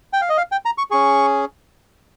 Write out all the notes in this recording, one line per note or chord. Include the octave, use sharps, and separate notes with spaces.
G5
F5
D#5
F5
G5
A#5
C#6
C#4 G#4 C#6